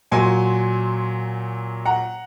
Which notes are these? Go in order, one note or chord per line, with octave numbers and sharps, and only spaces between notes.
A#2 F#3 G#5 C6
F#5 A#5